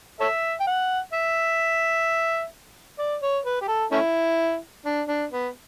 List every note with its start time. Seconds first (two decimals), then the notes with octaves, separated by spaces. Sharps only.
0.20 A4 C#5 E5
0.60 G5
0.67 F#5
1.13 E5
2.99 D5
3.23 C#5
3.46 B4
3.61 G4
3.68 A4
3.92 A3 C#4 E4
4.86 D4
5.08 D4
5.32 B3